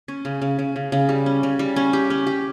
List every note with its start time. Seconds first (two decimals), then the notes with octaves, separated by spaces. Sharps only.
0.08 C#4
0.25 C#3
0.42 C#3
0.59 C#3
0.76 C#3
0.92 C#3
1.09 G3
1.26 C#4
1.43 C#3
1.59 G3
1.76 C#4
1.93 G4
2.10 C#4
2.27 G4